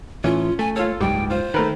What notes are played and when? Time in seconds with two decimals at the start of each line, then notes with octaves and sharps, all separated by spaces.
0.24 A2 E3 C#4 F4
0.59 A3 G#5
0.76 F4 A4 C#5
1.01 F#1 C#2 G#2 G3 G5
1.30 F4 C5
1.54 D#3 A3 A#4 B4